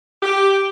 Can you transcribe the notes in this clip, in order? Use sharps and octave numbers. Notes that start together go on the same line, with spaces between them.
G4